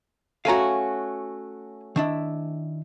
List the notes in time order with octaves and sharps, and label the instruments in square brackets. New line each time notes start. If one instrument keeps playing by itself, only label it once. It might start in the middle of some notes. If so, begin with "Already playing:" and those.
[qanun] A3 C#4 F#4 [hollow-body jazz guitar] F5 G#5 A#5
[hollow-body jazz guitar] D#3 D4 E4